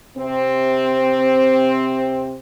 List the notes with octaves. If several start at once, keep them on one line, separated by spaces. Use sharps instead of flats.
C3 C4